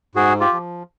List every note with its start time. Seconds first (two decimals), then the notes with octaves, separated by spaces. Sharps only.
0.15 G#2 F#4 G#4
0.40 F4 G4
0.53 F3